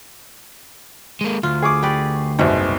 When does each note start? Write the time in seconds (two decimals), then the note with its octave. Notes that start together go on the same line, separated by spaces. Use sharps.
1.21 G#3 A#3
1.43 D2 F4
1.62 G#4 C#6 D6
1.83 G4 B4 D5
2.39 F#1 C2 G#2 B2